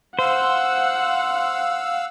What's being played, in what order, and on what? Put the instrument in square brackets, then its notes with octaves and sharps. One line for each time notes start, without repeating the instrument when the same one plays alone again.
[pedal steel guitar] C5 [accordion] F5 E6 [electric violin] F#5